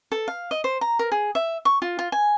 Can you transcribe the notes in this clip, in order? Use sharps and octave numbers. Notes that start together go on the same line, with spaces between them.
A4
F5
D#5
C5
A#5
A#4
G#4
E5
C#6
F4
F4
G#5